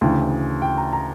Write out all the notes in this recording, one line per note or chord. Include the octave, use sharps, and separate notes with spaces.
D2 C#3 E3 G5
G5
A#5
A#5